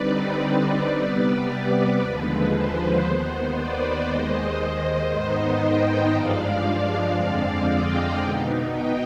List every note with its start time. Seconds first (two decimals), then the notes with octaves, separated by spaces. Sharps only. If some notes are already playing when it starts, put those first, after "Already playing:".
Already playing: D3 G3 C4 D#4 B4 D5
0.42 B4 D5
0.94 C3 G3 B3
1.97 D#2 D3 F3 G#3 B4
2.50 C5
3.01 D#2 D#3 B3
3.53 B4 D5
4.04 D#2 D#3 G#3 C5 D#5
5.08 G#2 D#3 B3 D#4 C5 D#5
5.60 D#5 G5
6.12 G2 F3 G#3 D4 D5 F5
7.16 F2 D3 G#3 C4
7.67 D#5 G5
8.19 B2 B3 D#4
8.71 D#5 G5